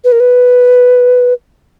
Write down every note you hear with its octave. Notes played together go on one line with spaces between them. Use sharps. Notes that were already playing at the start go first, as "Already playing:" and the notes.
B4
A#4
B4